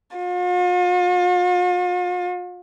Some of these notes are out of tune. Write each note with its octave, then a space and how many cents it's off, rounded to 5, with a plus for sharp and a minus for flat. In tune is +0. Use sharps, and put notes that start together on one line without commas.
F4 +45